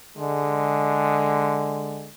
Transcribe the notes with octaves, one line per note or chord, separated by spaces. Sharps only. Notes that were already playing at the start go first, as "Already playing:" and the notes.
D3 G#3